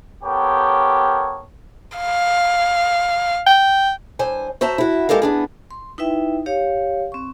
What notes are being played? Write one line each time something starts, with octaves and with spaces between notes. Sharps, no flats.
B3 G4 A4 A#4 C#5 G5
F5
G5
G2 C5 G#5
F#4 C5 E5 A5 A#5
E4 F#4
G#3 G4 A4 A#4 F5
B3 D4 G#4
C6
D#4 E4 B4 E5 G5
G4 C#5 F5
C4 C#6